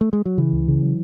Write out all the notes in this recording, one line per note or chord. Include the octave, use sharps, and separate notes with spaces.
A3
G#3
F#3
C#3 E3
C#2
C#3
F#3